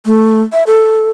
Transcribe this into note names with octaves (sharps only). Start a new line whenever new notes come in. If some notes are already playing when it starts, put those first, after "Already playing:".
A3
E5
A4